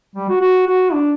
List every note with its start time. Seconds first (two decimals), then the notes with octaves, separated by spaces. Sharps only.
0.16 G3
0.29 F#4
0.41 F#4
0.67 F#4
0.93 D4